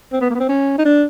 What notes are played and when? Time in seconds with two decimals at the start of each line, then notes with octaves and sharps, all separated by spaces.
0.12 C4
0.21 B3
0.30 A#3
0.35 B3
0.40 C4
0.49 C#4
0.78 D#4
0.85 D4